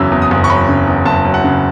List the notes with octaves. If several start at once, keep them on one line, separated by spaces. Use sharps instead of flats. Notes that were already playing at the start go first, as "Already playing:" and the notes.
Already playing: F#1 E2 C#3 F#3 E6
E2
D#6
F#1
C#6
F#3 B5
C#3
E2
F#1 A5
F#3
F#5
C#3